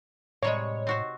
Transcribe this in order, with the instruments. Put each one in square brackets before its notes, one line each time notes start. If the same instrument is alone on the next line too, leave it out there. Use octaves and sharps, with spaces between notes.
[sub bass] A2 [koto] C3 G3 G#3 [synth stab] C#5
[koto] C4 F#4 C5